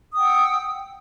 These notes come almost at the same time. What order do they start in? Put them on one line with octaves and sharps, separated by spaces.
D#6 G5 F#5 E6